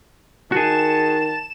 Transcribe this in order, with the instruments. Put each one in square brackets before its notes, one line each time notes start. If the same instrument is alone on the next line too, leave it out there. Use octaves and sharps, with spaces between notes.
[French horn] D#3 [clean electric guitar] F#4 G#4 [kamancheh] A5 [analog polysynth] E7